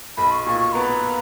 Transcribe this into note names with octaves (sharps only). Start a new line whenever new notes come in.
B1 B5
C#6
A#2 C#6
C#6
B3 A#5